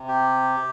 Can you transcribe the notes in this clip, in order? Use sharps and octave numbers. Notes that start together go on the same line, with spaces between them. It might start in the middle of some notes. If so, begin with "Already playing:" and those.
Already playing: C3
G4